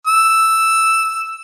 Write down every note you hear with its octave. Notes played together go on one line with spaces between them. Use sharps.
E6